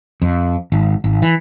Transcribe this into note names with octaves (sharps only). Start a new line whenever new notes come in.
F2
G#1
G#1
E3